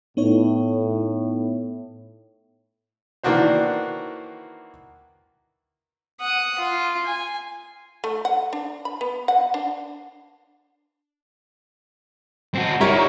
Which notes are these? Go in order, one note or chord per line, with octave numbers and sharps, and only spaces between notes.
A2 B3 D#4 C#5
D#3 E3 A#3 D4 F#4 C5
F#5 D#6
F4
G#5
A3
F#5
D4
B5
B3
F#5
D4
C4 F#4
G3 D#4 E4 A#4 C#5